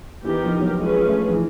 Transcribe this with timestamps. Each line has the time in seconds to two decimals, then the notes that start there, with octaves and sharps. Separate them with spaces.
0.24 E3 B3 D#4 G4 A#4
0.43 F3
0.60 F#3
0.78 G#3 C#4 F4 G#4 B4
1.05 A3
1.27 F3
1.33 E3